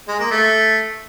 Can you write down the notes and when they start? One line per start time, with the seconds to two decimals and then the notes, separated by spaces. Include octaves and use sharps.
0.08 G#3
0.19 A#3
0.31 A3